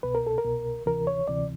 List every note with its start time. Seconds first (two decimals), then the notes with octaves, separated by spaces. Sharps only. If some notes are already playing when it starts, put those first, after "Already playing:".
0.03 C2 B2 B4
0.15 A#4
0.27 A4
0.38 A#4
0.44 C2 B2
0.86 D2 C3 E3 A#4
1.07 C#5
1.28 D2 C3 E3 D5